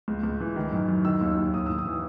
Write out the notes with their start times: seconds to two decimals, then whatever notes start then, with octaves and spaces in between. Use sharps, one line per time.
0.08 C#2
0.23 C#2
0.40 E3
0.56 D#3
0.72 F#2
0.89 F#2
1.05 D#3 E6
1.21 D#2
1.37 D#2
1.54 D#2 D#6
1.66 D#2 E6
1.78 D#6
1.86 E3